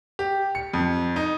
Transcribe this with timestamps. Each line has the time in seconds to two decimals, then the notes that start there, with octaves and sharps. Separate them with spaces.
0.19 G4
0.55 C#7
0.73 F2
1.16 D#4